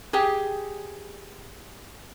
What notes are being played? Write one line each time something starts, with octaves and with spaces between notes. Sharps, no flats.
G4 G#4